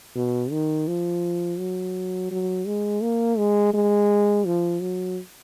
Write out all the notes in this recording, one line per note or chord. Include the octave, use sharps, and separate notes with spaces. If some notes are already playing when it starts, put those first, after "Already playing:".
B2
D#3
F3
F#3
F#3
G#3
A#3
G#3
G#3
F3
F#3